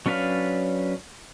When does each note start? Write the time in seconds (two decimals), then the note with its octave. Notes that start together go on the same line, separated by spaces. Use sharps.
0.06 F#3 C#4 D4 B4 F5